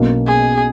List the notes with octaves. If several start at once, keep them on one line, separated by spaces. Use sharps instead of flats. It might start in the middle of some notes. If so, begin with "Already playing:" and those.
Already playing: B1 B2 A#3 C#4
G#4